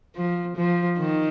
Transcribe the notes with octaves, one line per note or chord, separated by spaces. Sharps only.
F3
F3
D#3